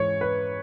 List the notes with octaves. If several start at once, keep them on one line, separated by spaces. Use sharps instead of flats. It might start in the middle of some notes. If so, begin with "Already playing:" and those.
Already playing: G#2 E3 C#5
B4